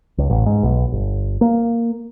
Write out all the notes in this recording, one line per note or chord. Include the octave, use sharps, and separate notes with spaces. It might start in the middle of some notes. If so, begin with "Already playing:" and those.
C#2
A1
G#2
B1
G1
A#3